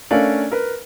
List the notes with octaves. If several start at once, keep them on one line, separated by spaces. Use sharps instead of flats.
A3 C#4 D4 A#4 D5 F5
A#4 B4